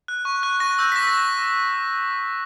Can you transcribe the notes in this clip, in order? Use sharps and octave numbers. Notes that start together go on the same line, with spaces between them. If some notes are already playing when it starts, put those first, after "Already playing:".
F#6
C#6
F#6
C#6 A#6
E6 G6
B6
D6 A#6
A#6
F#6
A#6